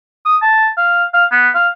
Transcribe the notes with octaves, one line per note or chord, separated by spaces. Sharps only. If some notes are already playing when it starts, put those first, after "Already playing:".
D#6
A5
F5
F5
B3
F5